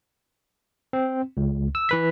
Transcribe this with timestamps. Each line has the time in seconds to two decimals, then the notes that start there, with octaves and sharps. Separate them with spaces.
0.93 C4
1.37 C#2
1.75 E6
1.89 E3 B4 B6